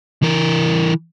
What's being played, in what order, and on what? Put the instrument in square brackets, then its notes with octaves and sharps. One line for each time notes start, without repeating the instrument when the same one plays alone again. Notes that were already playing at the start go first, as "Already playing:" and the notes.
[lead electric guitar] E3 A#4